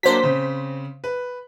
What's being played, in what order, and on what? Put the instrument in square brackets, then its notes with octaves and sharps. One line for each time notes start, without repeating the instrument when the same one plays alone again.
[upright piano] F#3 A#3 D4 [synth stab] C5 B6
[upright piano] C#3 C4
B4